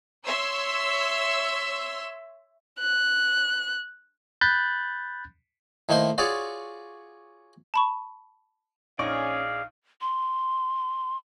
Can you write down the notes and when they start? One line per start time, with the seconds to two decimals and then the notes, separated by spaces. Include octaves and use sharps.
0.24 C#5 E5 C6 E6
2.79 F#6
4.41 B5 F#6 G6 A6
5.89 A2 D#3 A#3 C5 C6
6.18 F4 F#4 G#4 C#5 D5
7.74 A5 B5 C#6
8.99 A#1 C#4 D#4 G#4 D5 F5 C#6
10.01 C6